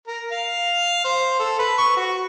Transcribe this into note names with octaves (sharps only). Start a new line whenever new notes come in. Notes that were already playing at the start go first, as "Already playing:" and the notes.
A#4
F5
C5
A4
B4
C#6
F#4